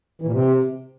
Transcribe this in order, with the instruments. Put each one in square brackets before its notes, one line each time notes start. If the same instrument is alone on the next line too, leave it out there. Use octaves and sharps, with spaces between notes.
[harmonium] E3
A#2
C3